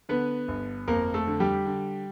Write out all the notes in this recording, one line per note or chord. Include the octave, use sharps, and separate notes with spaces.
D3 B3 B4
G1
F2 A#3 A#4
A3 A4
D3
G3 G4
D3